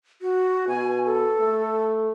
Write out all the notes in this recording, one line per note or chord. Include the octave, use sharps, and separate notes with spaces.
F#4
B2 G#5
A4
A3